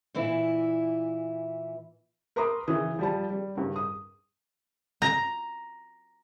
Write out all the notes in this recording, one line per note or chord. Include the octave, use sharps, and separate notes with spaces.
A#2 E3 E4
A#4 B4 A#5 C6 D6 D#6
C#3 E3 D#6
F3 G3 A5
G3
G2 C#3
D#6
A#5